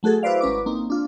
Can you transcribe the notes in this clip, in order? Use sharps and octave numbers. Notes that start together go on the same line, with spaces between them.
F#3 A3 F#4 G#4 A4
E4 F#4 B4 C5 D5 F5
G#1 C#4 B4 D6
A#3 C4 D#4
D4 F4